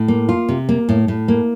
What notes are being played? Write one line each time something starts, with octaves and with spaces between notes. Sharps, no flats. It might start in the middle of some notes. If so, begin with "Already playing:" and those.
Already playing: A2
A#3
F4
C3
A#3
A2
A2
A#3